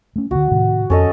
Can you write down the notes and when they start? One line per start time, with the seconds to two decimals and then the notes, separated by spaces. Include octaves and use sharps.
0.16 A3 C#4
0.31 D2 D3 F#4
0.51 A2 C3 D#3
0.90 F2 C#4 A4 D#5